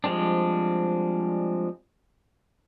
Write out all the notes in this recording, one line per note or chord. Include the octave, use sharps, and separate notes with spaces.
F3 G3 G#3 C4 D4